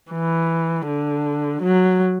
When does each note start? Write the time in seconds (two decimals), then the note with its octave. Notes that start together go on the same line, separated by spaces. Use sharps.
0.12 E3
0.87 D3
1.63 F#3